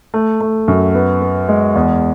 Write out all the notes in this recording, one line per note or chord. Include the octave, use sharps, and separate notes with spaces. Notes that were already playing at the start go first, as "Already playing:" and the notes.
A3
A3
F#2
B3
B3
G#3
E2